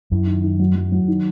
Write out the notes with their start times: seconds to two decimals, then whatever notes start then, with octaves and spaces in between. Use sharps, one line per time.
0.11 F#2 E4
0.27 D#3
0.44 D#3
0.59 F#3
0.75 F#3
0.92 F#3
1.08 D#3